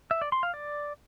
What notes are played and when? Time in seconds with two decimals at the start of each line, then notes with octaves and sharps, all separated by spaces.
0.11 E5
0.22 D5
0.32 C6
0.43 F5
0.54 D5